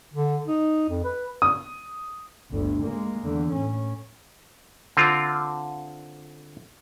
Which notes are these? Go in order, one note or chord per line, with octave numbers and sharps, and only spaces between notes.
D3
D#4
F2
B4
D#6
G1 D2
G#3 A#3
E2 D3
A2 C#4
D3 C4 F4